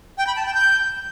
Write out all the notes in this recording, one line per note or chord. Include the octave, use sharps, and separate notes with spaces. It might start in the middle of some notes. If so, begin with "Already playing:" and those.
G5
B5
A5
G5
G6